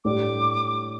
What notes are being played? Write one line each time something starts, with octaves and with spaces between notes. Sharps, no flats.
A2 G3 D4 D6